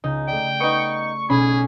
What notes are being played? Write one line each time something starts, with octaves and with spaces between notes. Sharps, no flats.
C#2 D#4 G6
A3 D5 G5
B3 D#4 C#6
B1 C#4 G#4 B5